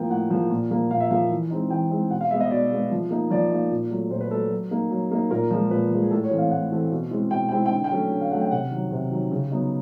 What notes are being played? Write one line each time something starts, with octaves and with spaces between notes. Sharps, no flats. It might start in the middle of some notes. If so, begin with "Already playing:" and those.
Already playing: A2 F3 A#3 G5
A2 F#5
F3 A#3
A#2
F3 A#3
A#2 F5
E5
F3 A#3 F5
E3
G#3 C4 D#4
E3 G5
G#3 C4 D#4
B2 F#5
F5
G#3 B3 E5
D#5
B2 D5
G#3 B3
F3
A#3 D#4
F3 D5
A#3 D#4
A#2
F#3 A3
A#2 C5
B4
F#3 A3 A4
F#3
A#3 D#4
F#3
A#3 D#4
A#2 A#4
F3 G#3
A#2 B4
F3 G#3
G#4
A2 A4
C#5
E3 A3 C4
F5
A2 F#5
E3 A3 C4
B2
G#3 C4 E4
B2 G5
G#3 C4 E4 G5
G5
D3
G5
F#3 A3 C#4
D3
F5
F#3 A3 C#4 F#5
G5
C3 F#5
D#3
F#3
C3
D#3 F#3
C#3
F#3 B3 D#4